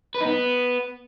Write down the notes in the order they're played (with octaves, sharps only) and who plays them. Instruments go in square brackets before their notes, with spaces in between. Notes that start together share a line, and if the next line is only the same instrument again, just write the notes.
[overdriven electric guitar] B4
D#4
B3